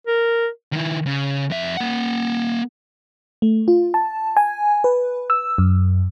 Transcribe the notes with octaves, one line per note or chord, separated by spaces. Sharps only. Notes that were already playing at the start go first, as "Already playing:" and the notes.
A#4
D#3 E4
C#3
F2 E5
A#3 F#5
A3
F4
A5
G#5
B4
E6
F#2